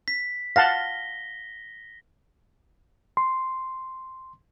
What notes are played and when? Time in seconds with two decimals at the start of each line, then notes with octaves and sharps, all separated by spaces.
0.08 B6
0.56 F5 F#5 A5 A#6 G7
3.17 C6